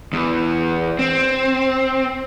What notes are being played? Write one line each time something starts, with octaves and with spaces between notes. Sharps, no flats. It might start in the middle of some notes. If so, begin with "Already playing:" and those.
E2
C4